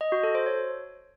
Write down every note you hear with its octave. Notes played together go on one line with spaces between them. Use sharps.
D#5
F#4
A4
C5
C#5